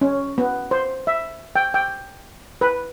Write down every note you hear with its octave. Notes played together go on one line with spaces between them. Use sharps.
C#4
B3
C5
E5
G5
G5
B4